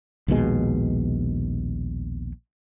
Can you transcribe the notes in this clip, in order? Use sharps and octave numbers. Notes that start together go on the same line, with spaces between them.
A#1 D#2 B2 G#3